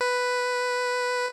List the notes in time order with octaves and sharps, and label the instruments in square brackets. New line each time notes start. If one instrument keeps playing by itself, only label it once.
[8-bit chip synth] B4